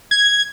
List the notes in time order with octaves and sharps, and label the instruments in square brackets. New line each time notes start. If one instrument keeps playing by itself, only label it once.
[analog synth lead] G#6